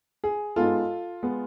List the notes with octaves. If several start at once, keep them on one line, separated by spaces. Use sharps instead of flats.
G#4
G#2 G#3 B3 F4 A4
G#3 B3